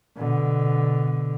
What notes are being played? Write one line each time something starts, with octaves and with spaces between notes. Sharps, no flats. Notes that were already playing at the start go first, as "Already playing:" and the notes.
B2 D3